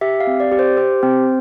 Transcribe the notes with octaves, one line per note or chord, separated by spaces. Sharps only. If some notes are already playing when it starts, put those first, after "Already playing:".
G4 E5
F5
C4
D5
G4
C5
G4 C5
C4